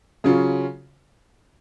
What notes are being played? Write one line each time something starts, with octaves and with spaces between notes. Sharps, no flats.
C#3 F#3 C#4 F4